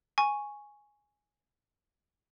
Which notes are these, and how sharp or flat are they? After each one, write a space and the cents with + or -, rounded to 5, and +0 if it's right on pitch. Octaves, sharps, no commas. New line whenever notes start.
G#5 +0 C#6 +0